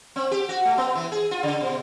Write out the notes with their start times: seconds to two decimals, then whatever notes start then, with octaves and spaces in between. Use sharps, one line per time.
0.16 C4
0.31 G4
0.49 F#4
0.65 A3
0.78 B3
0.95 E3
1.12 G#4
1.31 F4
1.43 C#3
1.61 B2